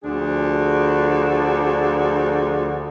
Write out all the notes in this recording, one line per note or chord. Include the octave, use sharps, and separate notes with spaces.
D2 F3 D4 G#4